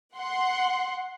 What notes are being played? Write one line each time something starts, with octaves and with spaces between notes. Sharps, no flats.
F#5 C6